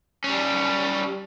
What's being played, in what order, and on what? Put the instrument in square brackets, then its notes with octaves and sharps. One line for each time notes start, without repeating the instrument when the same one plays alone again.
[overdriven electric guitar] G3 C#4